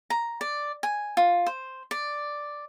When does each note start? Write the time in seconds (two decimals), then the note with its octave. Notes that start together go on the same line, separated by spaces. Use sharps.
0.10 A#5
0.41 D5
0.83 G#5
1.17 F4
1.46 C5
1.91 D5